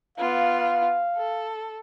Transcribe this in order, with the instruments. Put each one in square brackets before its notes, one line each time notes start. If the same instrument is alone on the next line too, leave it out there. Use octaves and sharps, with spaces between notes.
[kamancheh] B3 F4 [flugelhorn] F5
[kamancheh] A4